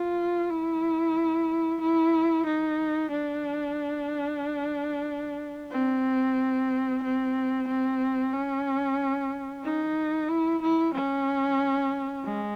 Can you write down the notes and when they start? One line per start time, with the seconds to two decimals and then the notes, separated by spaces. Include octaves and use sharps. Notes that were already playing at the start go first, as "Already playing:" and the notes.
Already playing: F4
0.50 E4
1.81 E4
2.46 D#4
3.11 D4
5.72 C4
7.03 C4
7.68 C4
8.33 C#4
9.64 D#4
10.29 E4
10.62 E4
10.94 C#4
12.25 G#3